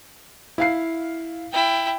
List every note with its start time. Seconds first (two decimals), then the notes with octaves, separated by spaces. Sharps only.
0.58 E4 F5 C7
1.53 E4 G5